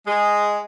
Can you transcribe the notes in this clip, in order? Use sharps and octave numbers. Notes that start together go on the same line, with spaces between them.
G#3